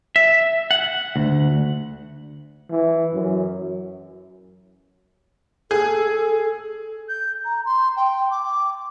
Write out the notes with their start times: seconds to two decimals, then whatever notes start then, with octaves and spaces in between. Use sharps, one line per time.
0.16 E5
0.71 F#5
1.16 D2
2.70 E3
3.14 F#2
5.71 G#4 A4
7.09 G6
7.45 A#5
7.66 C6
7.96 G5
8.31 D6